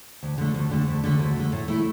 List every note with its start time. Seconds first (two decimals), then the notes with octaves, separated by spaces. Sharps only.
0.23 D2
0.38 D3 A3
0.54 D2
0.71 D3 A3
0.88 D2
1.04 D3 A3
1.19 D2
1.36 D3 A3
1.52 A2
1.68 A3 E4